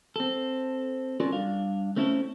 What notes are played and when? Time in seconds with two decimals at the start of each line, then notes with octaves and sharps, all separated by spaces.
0.16 C4 A4
1.20 C#4 F4 F#4 A4 A#4 D5
1.32 G2 D4 F5
1.96 A3 C4 C#4 E4 A4